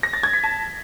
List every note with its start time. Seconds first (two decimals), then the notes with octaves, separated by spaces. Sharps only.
0.03 A#6
0.13 A6
0.23 G#6
0.33 B6
0.44 A5